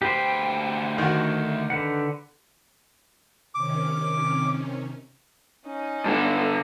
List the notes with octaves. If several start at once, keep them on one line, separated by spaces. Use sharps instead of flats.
D2 G4 B4 C5 G5
D#3 F#4
D3 B4 F#5
C3 D#3 C#4 D6
C#4 D#4
G2 D3